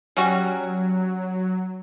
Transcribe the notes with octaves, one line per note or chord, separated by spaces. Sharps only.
F#3 G3 C#4 F#4